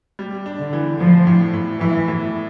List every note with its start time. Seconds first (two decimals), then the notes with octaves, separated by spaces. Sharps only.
0.19 G3
0.46 D4
0.60 D3
0.73 E3
1.00 A2 F3
1.27 A2
1.53 A2
1.80 A2 E3
2.08 A2